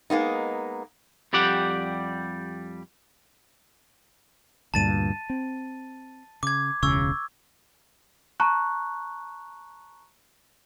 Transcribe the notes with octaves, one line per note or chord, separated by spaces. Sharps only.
G#3 A#3 B3 D#4
F2 G3 G4 D5 F#5
D2 G2 A#2 A5 A6 D#7
C4
C#3 D6 G#6
E1 C#2 C#3 C#6 E6 G#6
A5 A#5 C#6 F#6